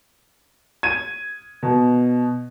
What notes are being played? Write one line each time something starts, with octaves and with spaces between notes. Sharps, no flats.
G#6 D#7
B2